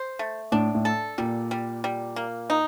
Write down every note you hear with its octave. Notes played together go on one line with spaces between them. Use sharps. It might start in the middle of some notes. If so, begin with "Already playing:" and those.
Already playing: C5
A3
A2 D4
A2
A4
A#2 G3
G3
G3
A#3
D#4